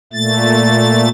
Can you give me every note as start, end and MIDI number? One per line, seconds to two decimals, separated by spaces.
0.13 1.09 46
0.13 1.09 57
0.13 1.09 93